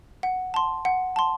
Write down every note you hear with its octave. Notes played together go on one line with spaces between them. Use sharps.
F#5
A5 C6
F#5
A5 C6